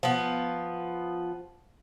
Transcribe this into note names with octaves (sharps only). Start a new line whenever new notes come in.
F3 B3